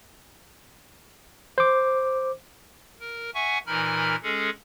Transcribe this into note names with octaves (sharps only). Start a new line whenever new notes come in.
C5 D6
A#4
E5 F#5 G#5 C#6
A#2 E3 D#4 A#4 B5 F6
G#3 C#4 G#4 A4